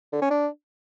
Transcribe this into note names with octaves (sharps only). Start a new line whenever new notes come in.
D3
C#4
D4